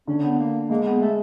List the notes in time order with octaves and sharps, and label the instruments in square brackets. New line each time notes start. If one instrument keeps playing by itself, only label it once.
[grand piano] D3 [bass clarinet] C#4
[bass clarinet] B3
A#3
[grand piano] G#3 [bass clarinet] A#3
[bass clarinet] B3
A3